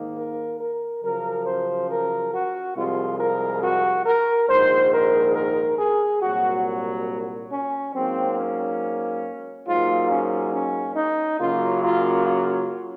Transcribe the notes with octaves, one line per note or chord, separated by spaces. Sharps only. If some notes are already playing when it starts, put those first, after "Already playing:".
Already playing: G#2 D#3 A#3
A#4
A#4
F#2 C#3 F3 A#4
C5
A#4
F#4
C2 C3 F3 G#3 F4
A#4
F#4
A#4
A#1 G#2 D#3 C5
A#4
A#4
G#4
C2 A#2 F#3 F#4
C#4
G#2 F#3 A#3 C4
C#4
G#2 F#3 A#3 F4
C#4
C#4
D#4
F#2 C#3 F#3 A#3 F4
F4
F4